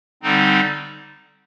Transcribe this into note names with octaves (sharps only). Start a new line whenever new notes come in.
D3 G3 C4 D#4